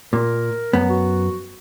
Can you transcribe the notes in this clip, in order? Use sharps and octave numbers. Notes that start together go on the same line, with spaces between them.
A#2 A#4
F#2 B3
F#4